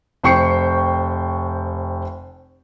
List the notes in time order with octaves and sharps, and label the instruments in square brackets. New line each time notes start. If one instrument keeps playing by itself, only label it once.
[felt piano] F1 C5 G5 C#6 C7 C#7